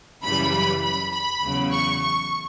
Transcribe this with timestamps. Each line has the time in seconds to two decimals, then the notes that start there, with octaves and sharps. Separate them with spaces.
0.23 F#2 C#3 E3 G3 B5
0.52 B5
0.83 B5
1.13 B5
1.42 E2 C#3 F#3
1.72 C#6
2.02 C#6